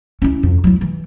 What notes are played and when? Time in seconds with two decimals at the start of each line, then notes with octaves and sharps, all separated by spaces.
0.22 C#4 E4
0.43 F2
0.64 F#3 E4
0.81 E3